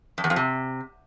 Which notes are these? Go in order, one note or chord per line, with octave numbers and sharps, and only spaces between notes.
F2
E2
F2
C3